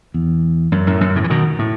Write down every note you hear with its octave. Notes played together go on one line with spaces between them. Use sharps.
E2
F#2
F#2 A2
F#2
A2 C#3
E3
B2 D#3
A2